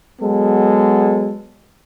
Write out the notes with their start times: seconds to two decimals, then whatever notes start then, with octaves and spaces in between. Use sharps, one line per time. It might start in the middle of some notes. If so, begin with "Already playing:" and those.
0.21 F#3 G#3 B3 A4